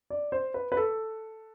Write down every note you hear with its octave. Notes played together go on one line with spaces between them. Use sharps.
D5
C5
B4
B4
A4